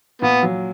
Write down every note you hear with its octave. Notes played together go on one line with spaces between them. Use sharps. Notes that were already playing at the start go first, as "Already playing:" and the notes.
A#2 B3
F#3